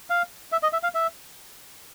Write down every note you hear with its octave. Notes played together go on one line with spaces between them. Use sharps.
F5
E5
D#5
E5
F5
E5